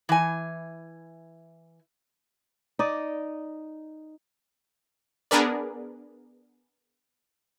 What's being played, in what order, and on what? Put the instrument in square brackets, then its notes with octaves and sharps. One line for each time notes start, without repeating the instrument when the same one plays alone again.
[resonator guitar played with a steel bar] E3 G#5
[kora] D#4 D5 D#5
[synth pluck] B3 D4 G#4 A#4 B4 D5